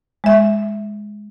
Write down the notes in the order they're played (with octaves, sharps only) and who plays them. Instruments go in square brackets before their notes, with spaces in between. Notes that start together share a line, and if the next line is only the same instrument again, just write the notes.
[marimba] G#3 E5